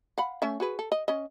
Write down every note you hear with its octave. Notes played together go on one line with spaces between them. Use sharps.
F5 F#5 B5
A3 C#4 E5
F#4 G#4 B4
A4
D#5
C#4 D#5